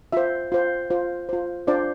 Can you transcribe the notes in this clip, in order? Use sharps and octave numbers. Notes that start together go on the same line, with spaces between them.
F4 C5 E5
F4 C5
F4 C5
F4 C5
D4 F4 C5 D5